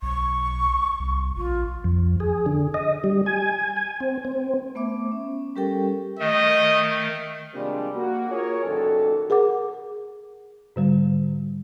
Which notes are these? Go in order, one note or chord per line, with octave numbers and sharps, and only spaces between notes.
B1 C#6
C2
A#1 F4
F2
G#4
D3
D#5
G3
G#5
G#5
C4
C4
A3 B3 E5 D6
C#4
G3 C#4 G4 A4 A#4 G5
D#3 A3 D#5
C3 F3 G3 G#3 A#3 D4
A#3 F#4
F4 G#4 A#4 C#5
F#1 B1 A#2 D#3 F#4 A4
G#4 A#4 F#5 D6
G#2 D3 G3